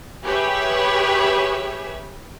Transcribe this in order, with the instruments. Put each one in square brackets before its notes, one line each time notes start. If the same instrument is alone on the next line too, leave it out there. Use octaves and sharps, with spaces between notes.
[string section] G4 G#4 B4 C#5 E5